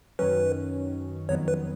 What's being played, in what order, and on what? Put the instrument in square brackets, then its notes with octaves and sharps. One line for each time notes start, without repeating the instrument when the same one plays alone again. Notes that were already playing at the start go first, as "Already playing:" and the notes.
[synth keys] F#2 D#3 F#3 C#4 [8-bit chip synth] B4
[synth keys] F2 D#3 F#3 B3 [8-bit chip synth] C#5
[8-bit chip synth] B4